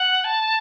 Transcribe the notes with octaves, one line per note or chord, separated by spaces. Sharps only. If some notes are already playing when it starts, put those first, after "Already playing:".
Already playing: F#5
A5